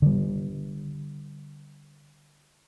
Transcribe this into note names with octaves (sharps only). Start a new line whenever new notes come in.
D3 G3